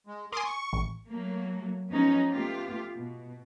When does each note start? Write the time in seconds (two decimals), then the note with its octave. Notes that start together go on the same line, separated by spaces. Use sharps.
0.07 G#3
0.33 A#4 G#5 C6 D6 D#6
0.45 C#6
0.73 A1
1.07 F#3 A3 A#3
1.91 F3 G#3 B3 C#4 D#4
2.30 A3 B3 F4 G4
2.94 B2